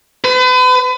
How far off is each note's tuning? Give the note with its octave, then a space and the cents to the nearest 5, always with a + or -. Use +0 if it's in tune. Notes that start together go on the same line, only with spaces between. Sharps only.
B4 +40